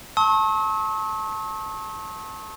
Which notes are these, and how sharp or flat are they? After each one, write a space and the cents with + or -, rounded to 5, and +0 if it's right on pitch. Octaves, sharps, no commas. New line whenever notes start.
A5 +0 C#6 -40 E6 -45